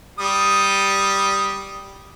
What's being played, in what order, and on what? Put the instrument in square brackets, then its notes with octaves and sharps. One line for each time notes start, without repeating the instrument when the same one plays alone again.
[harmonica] G3 D#6